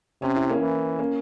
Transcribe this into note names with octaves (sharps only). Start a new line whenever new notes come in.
C3 C#4
E4
A#3 C#4
E3
A#3 C#4